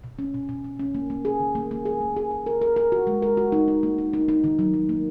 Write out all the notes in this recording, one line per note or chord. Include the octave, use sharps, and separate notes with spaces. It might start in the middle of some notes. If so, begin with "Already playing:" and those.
B2
C#4
B2
B2
B2
C#4
A#3
A#3
G#4
D#3
A#3
A#3
G#4
A#3
G#4
G#4
A#4
A#4
A#4
F#4
G#3
A#4
F#4
D#4
D#4
A#3
D#4
D#4
D#4
D#3
F#3
F#3
A#3